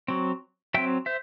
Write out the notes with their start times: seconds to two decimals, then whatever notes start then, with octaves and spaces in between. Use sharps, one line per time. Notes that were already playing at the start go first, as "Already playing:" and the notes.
0.08 F#3 C4
0.74 F#3 C4 E5 G5
1.06 C5 E5